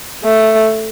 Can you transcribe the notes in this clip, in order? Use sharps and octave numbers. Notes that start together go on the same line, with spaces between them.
A3